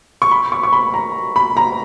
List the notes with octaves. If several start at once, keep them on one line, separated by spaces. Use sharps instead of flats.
C#6
B5
C#6
C#6
B5
A#5
B5
A#5